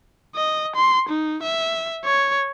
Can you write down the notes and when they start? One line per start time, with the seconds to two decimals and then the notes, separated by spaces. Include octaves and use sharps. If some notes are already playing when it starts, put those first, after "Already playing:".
0.35 D#5
0.76 C6
1.09 D#4
1.43 E5
2.04 C#5